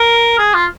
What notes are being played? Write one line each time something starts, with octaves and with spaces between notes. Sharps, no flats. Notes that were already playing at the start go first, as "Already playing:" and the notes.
Already playing: A#4
G#4
F4